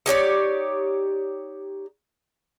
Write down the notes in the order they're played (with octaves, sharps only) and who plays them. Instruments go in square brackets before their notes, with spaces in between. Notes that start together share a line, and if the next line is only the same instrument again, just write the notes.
[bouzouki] D#4 G4 C#5 D5